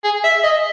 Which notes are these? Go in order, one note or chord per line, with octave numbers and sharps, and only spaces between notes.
G#4
E5
D#5